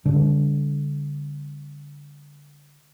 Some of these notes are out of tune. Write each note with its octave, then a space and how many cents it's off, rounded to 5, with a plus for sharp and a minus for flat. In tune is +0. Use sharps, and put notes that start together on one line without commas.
D3 -20 G3 +45 D4 -45